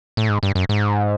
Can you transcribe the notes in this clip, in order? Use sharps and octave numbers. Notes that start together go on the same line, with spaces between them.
A2
G#2
G2
F#2
G#2